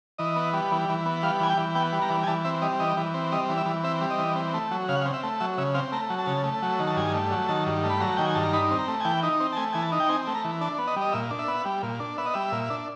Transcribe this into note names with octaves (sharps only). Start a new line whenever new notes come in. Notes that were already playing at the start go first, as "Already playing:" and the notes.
E3 D#5
B3
G3
E3
E3
B3
G3 F5
E3 G#5
G5
E3
B3 G5
G3
A#5
E3
G#5
E3 A5
C4 E5
G3 D#5
E3 D#5
E3
C4
G3 D#5
E3
E5
E3
C4 E5
G3
D#5
E3
C4
A3
F#3
C#3 F5
F#5
F5
C4
E5
A3
F#3 E5
C#3 E5
C4 F5
A3 A#5
F#3
A5
C#3
A3
F#3
D#3
A5
G2 G#5
A3
F#3
D#3 A5
G2
A3
B5
F#3 A#5
D#3 G5
G#5
G2 A5
A#5
D#4 B5
C4
A#5
A3
G#5
E3 G5
D#4
C4
A5
A3 G#5
E3 G#5
A5
D#4
G5
C4 G#5
A3
A#5
E3
D4 A5
B3
D#5
G3
D#5
A#2 E5
D4
E5
B3
G3
A#2
D4
B3 E5
D#5
G3 E5
A#2
D4